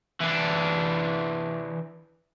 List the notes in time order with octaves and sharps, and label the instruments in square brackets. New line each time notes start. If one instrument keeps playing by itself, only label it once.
[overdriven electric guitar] E3 D4